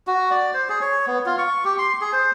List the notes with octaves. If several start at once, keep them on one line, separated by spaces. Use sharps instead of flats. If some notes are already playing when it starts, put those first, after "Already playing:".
F#4
D5
C5
G#4
C#5
B3
F4
C#6
G4
C6
G#4
C5